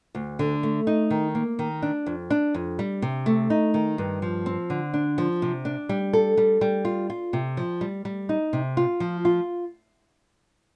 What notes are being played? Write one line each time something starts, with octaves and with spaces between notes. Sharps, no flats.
D2
D3
A3
D#4
D#3
A#3
D#3
D4
F2
D4
F2
G3
C3
A3
D#4
D#3
G2
F3
C4
D3
D4
F3
C3
D4
G3
A4
G3
G3
F4
F4
C3
F3
G3
G3
D#4
C3
F4
F3
F4